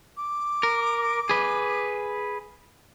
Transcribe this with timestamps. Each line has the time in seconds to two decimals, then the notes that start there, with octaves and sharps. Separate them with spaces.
0.17 D6
0.63 A#4
1.29 G#4 B4